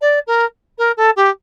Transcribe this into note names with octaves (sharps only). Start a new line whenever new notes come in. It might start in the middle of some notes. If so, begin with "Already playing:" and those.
D5
A#4
A#4
A4
G4